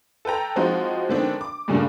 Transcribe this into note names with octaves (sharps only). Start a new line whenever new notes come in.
A4 B4 G5 A#5
F3 G#3 C4 D#4 F#4
G#2 D3 D#3 B3 C4 D4
D6
G2 A#2 C#3 G3 A3 D4